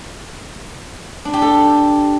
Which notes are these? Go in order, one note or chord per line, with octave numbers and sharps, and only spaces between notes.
D4
G4
A4